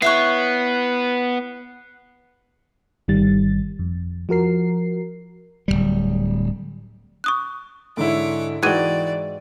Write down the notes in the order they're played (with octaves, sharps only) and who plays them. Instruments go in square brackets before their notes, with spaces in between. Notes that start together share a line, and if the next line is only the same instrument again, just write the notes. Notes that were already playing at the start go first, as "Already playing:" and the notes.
[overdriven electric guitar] B3 [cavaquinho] E4 C#5 C#6 [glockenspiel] F#6 C7
[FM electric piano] G1 D#3 G3 A6
F2
F3 F#4 A#4 C7
[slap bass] D1 D#2 G3
[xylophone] C#6 D#6 F#6
[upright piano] G#2 D3 E4 [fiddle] C#5 D6
[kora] G#2 F#4 G5 [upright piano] E3 [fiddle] D5 [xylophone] F#6 G#6 D#7